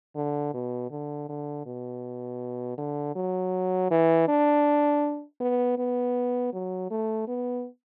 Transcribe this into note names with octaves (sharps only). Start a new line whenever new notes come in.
D3
B2
D3
D3
B2
D3
F#3
E3
D4
B3
B3
F#3
A3
B3